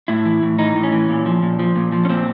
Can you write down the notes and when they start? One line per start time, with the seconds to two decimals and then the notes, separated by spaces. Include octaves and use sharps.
0.08 A2 E4
0.25 E3
0.43 A2
0.59 E3 D#4
0.75 A2
0.83 C#4
0.92 E3
1.09 A#2
1.26 F3
1.42 A#2
1.59 F3
1.76 A#2
1.92 F3
2.05 C#4
2.09 A#2 C4